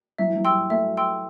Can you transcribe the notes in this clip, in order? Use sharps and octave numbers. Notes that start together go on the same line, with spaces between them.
F#3 E5
E3
F#3
G3 G5 C6 E6
A3 E5
G5 C6 E6